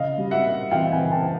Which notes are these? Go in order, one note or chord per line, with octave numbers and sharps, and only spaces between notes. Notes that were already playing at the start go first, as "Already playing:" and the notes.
Already playing: C#3 D#5 F5
G3
E5 F#5
A#3
E3 F5 G5
F#5 G#5
C#3
G5 A5